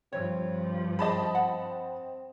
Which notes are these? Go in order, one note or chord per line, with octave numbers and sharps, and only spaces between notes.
G2 F3 C4 C#5
C4 G#4 D#5 A5 B5
F#5